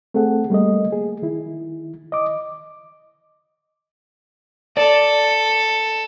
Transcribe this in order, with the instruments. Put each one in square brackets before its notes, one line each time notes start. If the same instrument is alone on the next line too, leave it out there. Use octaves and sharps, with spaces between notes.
[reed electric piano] A3 C4 G#4 A4 F#5
G3 A3 A#3 D#5
G#4
D#3 E4
D#5 D6
[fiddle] A4 [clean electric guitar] D5